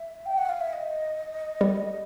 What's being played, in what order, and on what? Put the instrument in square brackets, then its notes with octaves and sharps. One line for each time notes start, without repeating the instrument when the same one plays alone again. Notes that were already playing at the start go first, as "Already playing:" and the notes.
Already playing: [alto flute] E5
G5
F#5
F5
E5
D#5
[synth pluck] G3